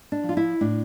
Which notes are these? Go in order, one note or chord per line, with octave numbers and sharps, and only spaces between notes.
D4
F3
F4
E4
A2 D4